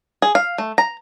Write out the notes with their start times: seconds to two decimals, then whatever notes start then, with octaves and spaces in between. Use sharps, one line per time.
0.22 G#4
0.35 F5
0.58 A3
0.78 A#5